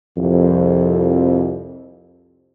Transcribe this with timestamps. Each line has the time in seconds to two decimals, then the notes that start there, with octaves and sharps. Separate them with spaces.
0.17 C2 F2